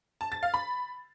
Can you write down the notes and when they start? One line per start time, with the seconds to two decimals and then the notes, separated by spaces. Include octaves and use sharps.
0.21 A5
0.32 A6
0.43 F5
0.54 B5